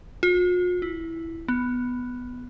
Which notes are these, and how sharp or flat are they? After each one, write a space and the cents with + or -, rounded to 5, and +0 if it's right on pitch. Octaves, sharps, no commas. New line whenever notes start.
F4 +45
E4 +0
B3 +5